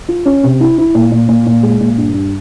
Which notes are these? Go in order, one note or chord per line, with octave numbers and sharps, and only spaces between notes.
F4
C#4
C3
E4
E4
A#2
A#2
A#2
A#2
G#3
A#2
G2
G2